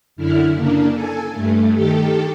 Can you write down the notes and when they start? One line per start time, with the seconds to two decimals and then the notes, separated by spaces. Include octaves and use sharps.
0.16 F#2 D3 E4 F6
0.54 C#3 A#3 D4
0.93 A4 G#5
1.33 G2 A3
1.75 D#3 G4 A4